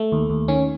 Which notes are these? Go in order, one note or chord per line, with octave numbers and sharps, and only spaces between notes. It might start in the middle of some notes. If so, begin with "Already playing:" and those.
Already playing: A3
D#2
D#2
D#3 C#4